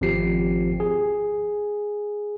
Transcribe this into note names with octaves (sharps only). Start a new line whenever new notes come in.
G#1 F3 C4 G4 C7
G#4